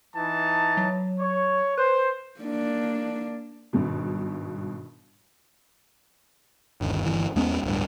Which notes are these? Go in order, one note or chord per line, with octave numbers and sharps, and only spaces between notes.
E3 D#4 A5
F#3
C#5
B4 C5
A#3 D4
G#1 G2 B2
G1 D#2
G1 E3
E2 G#3 B3 C#4
D1 G2